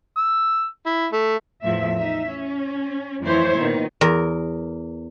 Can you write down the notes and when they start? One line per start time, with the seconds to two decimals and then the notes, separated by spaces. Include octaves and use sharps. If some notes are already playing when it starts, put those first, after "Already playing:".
0.17 E6
0.86 E4
1.12 A3
1.62 E2 A2 F3 E5
1.97 D#4 E5
2.28 C#4
3.21 F2 E3 A3 E4 C5 C#5
3.58 A#2 D#3 B3
4.01 E2 A#4